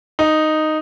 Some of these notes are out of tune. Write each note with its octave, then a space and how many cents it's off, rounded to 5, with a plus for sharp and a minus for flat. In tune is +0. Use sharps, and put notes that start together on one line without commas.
D#4 -5